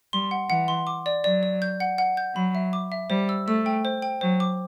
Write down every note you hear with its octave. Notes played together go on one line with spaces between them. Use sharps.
G3 C6
F#5
E3 F#5
C6
D6
D5
F#3 D5
D5
G6
F#5
F#5
G6
F#3 B5
E5
D6
E5
G3 C5
E6
A3 E6
G5
C5
G5
F#3 C5
D6